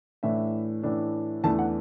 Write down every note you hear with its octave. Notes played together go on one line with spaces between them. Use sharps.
A2 E3 A3 D4 E5
A2 E3 A3 D4
E2 E3 A3 D4 A5
F#5